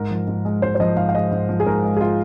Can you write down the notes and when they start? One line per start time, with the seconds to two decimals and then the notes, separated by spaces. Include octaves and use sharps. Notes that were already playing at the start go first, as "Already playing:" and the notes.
Already playing: G#2 A#4
0.11 F3
0.27 G#2
0.45 G#3
0.62 G#2 C5
0.75 C5
0.80 F3 D#5
0.97 G#2 F5
1.09 F5
1.15 G#3 D#5
1.32 G#2
1.49 F3
1.60 G#4
1.66 G#2 A#4
1.83 G#3
1.96 G#4
2.01 F4